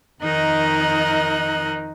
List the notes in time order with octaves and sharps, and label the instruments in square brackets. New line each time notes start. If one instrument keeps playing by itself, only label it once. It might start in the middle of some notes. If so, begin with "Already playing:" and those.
[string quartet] F2 D#3 D#4 A#4 D#5 F#6